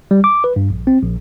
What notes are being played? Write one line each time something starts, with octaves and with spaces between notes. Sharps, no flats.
G3
D6
B4
G2
A#1
C4
A#1